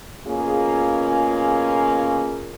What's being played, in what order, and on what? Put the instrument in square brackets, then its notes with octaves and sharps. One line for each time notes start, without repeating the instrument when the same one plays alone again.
[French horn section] B2 A#3 C#4 F4 G#4